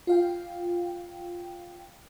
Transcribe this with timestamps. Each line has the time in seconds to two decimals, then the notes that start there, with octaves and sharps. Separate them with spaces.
0.07 F4 F5 G5